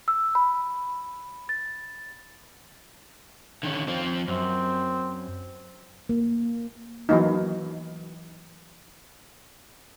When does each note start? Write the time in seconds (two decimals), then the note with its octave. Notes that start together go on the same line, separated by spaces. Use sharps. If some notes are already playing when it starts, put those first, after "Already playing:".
0.08 E6
0.35 B5
1.49 A6
3.63 D3 D#3 C#4
3.88 F3 C4
4.28 F#2 C4
6.09 A#3
7.09 E3 F#3 A#3 D#4